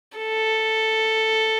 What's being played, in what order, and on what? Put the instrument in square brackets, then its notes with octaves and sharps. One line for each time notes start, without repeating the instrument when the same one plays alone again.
[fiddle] A4